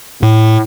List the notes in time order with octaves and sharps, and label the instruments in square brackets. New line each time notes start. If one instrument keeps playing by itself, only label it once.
[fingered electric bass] A2